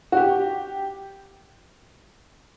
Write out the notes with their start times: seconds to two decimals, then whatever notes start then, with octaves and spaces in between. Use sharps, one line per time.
0.12 F#4
0.17 G4